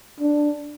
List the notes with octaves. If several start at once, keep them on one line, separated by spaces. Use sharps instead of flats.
D4